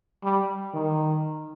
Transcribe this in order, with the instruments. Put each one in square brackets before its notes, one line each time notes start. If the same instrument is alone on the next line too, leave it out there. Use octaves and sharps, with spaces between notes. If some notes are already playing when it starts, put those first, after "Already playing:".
[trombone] G3
D#3